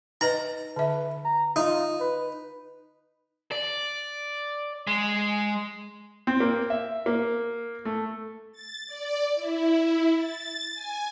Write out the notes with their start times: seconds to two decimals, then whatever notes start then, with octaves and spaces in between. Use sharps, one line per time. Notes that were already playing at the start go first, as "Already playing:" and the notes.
0.21 D#4 B4 D#5 A#5
0.76 D3 B4 E5
1.25 A#5
1.56 D#4 F4
2.00 B4
3.52 D5
4.87 G#3
6.27 C4
6.40 A#3
6.70 E5
7.06 A#3
7.85 A3
8.52 A6
8.87 D5
9.35 E4
10.16 A6
10.74 G#5